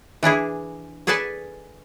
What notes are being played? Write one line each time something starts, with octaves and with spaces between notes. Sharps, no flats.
E3 D4 E4 G#4
G#4 A4 B4 D5 G#5 A5